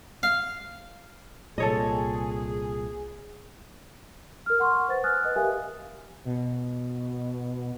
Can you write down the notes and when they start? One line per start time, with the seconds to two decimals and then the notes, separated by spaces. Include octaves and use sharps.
0.23 F5
1.58 C2 A#2 G#4 A4 C#5 D#5
4.46 A#4 F6
4.60 F#5 C6 C#6 F6
4.88 B4 C5 F#5 A6
5.04 G#5 D#6 F6 F#6 A6
5.23 B4 D#5 D#6 F#6
5.36 G4 A#4 E5 F5 G#5
6.25 B2